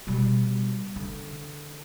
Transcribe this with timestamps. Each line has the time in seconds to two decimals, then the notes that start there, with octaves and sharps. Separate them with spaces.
0.07 B2 G3
0.96 D3